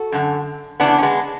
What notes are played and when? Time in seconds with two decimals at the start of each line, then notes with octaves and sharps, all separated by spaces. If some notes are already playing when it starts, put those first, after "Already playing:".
Already playing: F#4 A4
0.12 F#2 D3
0.80 E2 C#3 E3 B3 D4
0.98 C#4
1.03 G#3 B3